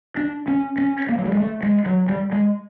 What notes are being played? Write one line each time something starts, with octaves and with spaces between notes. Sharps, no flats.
D4
C#4
C#4
A#3
F#3
G3
G#3
A3
G#3
F#3
G3
G#3